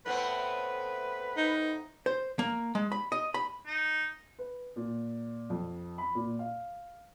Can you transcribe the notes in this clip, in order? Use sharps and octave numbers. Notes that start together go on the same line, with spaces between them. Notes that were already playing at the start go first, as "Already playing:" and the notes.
A2 B3 C4 B4
D#4
C5
A#3
G#3
B5
D#5
B5
D#4
B4
A#2
F2
B5
A#2
F5